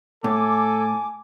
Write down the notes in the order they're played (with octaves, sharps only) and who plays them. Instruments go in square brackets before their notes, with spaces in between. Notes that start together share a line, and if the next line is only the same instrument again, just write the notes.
[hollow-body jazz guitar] A2 [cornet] A4 [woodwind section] G#5 D6